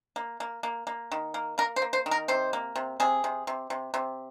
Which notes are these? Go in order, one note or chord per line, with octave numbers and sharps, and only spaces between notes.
A#3
A#3
A#3
A#3
D#3
A#3
A#3 A#4
C5
A#3
C5
D#3
A#4
C3 C5
A#3
C3
C3 G#4
C3
C3
C3
C3